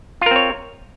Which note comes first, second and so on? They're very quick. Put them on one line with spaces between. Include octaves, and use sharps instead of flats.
F4 A#4 C4 C#5